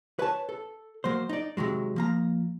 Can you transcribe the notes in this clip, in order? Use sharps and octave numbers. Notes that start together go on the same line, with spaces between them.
B4 C#5 A5
A4
F#3 A#3 C5
D#4 D5
C3 D#3 F#3 G#3
F3 A#3 A#5